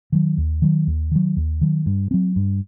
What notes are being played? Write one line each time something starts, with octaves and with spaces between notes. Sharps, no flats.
D#3 F#3
D#2
D#3 F#3
D#2
D#3 F#3
D#2
D#3 F#3
G2
F#3 C4
G2